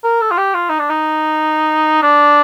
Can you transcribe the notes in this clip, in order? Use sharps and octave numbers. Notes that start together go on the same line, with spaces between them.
A#4
A4
F4
G4
F4
D#4
D4
D#4
D4